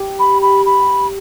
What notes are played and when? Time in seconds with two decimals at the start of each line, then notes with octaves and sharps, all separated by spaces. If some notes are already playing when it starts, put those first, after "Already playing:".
Already playing: G4
0.19 B5
0.42 B5
0.66 B5